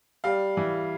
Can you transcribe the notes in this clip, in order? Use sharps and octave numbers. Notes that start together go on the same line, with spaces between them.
G3 F5
E3